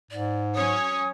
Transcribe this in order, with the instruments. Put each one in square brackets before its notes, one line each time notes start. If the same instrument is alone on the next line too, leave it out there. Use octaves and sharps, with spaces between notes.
[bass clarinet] G#2 [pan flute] D5
[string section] F#3 C#4 C#5 [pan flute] D#6